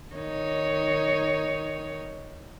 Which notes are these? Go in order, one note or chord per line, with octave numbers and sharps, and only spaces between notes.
D#3 D#4 C#5